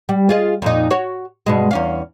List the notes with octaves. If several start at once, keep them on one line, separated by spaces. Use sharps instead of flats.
G3
F4 G#4 D#5
F2 A#2 D#4
F#4 C#5
G2 B2 G#3
E2 C#4 F5